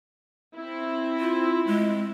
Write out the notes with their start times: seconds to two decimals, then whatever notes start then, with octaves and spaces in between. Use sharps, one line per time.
0.56 C4 E4
1.20 F4
1.67 G#3